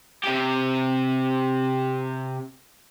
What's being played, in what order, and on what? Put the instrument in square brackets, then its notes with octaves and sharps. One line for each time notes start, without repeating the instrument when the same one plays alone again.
[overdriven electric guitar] C3 G4